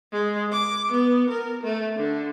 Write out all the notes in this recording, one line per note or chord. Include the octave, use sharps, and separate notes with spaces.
G#3
D6
B3
A#4
A3
D3